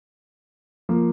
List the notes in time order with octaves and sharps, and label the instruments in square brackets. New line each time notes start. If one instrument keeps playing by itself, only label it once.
[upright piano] F3 A#3